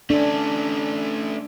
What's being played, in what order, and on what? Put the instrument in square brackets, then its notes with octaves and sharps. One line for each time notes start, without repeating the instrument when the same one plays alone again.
[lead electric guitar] A3 C#4 [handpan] D4